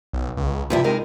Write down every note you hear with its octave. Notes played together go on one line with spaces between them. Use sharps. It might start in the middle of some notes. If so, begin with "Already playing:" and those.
B1
C#2
G2 C3 F3 E4
G#3 D#4 A#4